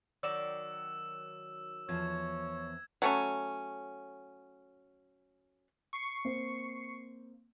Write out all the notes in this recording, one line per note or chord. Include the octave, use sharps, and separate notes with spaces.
D#3 F#3 D5 E6 E7
E2 F3 C#5 G#6
F#3 A3 C#4
C#6 C7 C#7
A#3 C4 C5